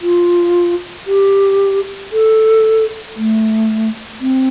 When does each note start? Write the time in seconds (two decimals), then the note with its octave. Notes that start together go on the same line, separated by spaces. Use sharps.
0.02 F4
1.07 G4
2.12 A4
3.16 A3
4.21 C4